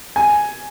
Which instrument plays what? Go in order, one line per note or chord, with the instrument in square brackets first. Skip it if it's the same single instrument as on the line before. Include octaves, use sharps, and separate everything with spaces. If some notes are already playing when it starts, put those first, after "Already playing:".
[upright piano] G#5